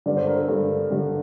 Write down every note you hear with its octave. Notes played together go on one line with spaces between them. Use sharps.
G2 D3 D5
C5
A#4
A4
G2 D3
G2 D3